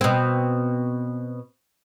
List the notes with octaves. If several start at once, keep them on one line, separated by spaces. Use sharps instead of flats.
B2 C4